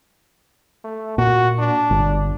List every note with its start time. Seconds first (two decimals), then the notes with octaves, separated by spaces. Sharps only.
0.84 A3
1.18 A#2 F#4
1.59 D4
1.90 G1